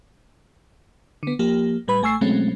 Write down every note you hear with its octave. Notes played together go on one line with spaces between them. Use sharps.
D3 B3
F3 A#3 G4
A2 G3 B4 B5
A1 A3 G#5 C#6 E6 C7
B2 F#3 G#3 A3 C4 C#4